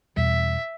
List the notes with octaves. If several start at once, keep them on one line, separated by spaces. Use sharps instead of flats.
E2 B2 G3 E5